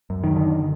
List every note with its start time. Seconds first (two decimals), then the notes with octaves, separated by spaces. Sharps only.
0.10 F#2
0.24 D#3
0.36 D3